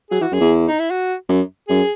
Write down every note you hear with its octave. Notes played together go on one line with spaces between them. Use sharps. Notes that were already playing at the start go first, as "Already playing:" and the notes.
F#3 G#4
E3 F#4
F#2 G#4
E2
D#4
E4
F#4
F#2
F#2 G#4